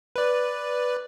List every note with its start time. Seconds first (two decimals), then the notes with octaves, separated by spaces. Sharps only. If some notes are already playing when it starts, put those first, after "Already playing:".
0.16 B4 D5